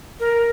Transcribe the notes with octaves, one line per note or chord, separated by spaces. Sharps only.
A#4